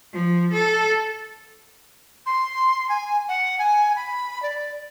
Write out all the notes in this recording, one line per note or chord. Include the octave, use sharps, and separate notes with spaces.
F3
A4
C6
G#5
F#5
G#5
B5
D5